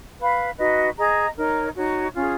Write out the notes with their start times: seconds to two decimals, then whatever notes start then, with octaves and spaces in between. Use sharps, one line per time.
0.18 B4 F5 B5
0.58 D#4 F#4 B4 D#5
0.97 G#4 D#5 A#5
1.36 D#4 A#4 C#5
1.76 D#4 F#4 C#5
2.15 C#4 F4 G#4